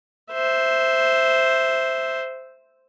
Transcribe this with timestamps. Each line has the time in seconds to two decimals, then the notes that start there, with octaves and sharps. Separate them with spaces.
0.32 C5 E5